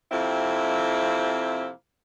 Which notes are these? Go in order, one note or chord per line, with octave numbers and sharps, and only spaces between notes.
F2 C3 A#3 C4 E4